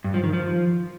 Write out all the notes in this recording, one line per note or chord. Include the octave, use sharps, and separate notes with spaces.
G2
F3
D#3
F3